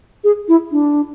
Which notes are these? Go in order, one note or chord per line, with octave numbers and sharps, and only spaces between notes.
G#4
E4
D4